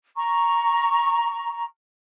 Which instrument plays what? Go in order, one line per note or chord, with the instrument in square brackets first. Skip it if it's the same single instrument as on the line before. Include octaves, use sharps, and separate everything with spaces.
[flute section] A#5 C#6